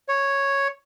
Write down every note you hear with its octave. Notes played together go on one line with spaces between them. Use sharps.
C#5